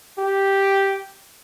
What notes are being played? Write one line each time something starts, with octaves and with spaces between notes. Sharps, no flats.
G4